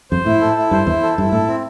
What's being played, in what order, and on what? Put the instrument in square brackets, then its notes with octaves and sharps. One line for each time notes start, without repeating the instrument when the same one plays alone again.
[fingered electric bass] F2 [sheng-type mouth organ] C5
[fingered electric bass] A2 [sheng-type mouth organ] E4
[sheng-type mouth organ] A4
E4
[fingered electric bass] G2 [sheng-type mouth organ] C5
[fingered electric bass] E2 [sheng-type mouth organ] E4
[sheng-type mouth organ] A4
[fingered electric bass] G2 [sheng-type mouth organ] E4
[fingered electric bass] A2 [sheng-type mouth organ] A4
[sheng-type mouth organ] C4